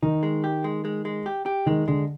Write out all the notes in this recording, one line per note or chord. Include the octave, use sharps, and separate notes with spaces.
D#3 D#4
G#3
G4
G#3
G#3
G#3
G4
G4
D#3 G#3
D3 G#3